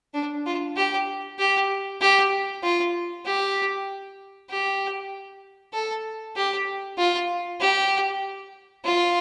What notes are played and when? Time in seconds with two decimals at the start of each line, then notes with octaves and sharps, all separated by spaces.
0.14 D4
0.46 F4
0.76 G4
1.39 G4
2.01 G4
2.63 F4
3.26 G4
4.50 G4
5.73 A4
6.36 G4
6.98 F4
7.60 G4
8.85 F4